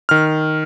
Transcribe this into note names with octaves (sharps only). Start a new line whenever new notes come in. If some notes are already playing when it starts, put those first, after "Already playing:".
D#3 F6